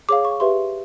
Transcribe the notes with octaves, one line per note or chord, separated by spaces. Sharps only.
G#4 C#5 F5 D6
C#6
G4 B4 E5 C6